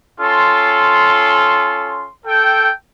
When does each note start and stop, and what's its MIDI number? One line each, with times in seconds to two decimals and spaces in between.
0.20 2.08 61
0.20 2.08 65
0.20 2.08 69
0.20 2.08 84
2.26 2.69 69
2.26 2.69 79